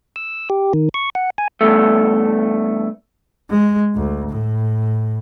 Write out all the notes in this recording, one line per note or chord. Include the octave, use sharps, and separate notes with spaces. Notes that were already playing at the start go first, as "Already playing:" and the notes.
E6
G4
D#3
C#6
F#5
G#5
E2 G2 A3
G#3
D2
A2